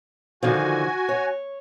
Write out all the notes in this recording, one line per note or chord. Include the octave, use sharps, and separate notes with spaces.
D3 D#3 F3 F#4 G#5
C#5